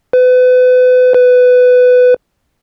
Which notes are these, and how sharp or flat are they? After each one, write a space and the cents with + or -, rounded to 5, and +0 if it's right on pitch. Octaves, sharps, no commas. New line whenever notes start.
B4 +35
B4 +15